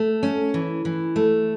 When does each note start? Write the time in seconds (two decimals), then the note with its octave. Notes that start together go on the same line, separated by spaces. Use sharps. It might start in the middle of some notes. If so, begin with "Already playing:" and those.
Already playing: A3
0.23 C#4
0.54 E3
0.85 E3
1.16 A3